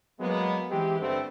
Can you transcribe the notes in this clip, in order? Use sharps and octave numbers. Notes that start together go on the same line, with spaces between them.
F#3 G#3 A#3 B3
E3 G#3 C4 E4 G4
G2 D3 A3 B3 C4